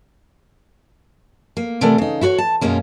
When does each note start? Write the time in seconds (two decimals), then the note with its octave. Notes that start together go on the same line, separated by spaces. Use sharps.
1.57 A#3
1.81 C3 E3 A3 A#4 D5 F#5
1.98 C#3 D#4
2.21 E4 F#4 A4 C#5 F#5
2.38 A5
2.61 F#2 B2 G#3 A#3 C#4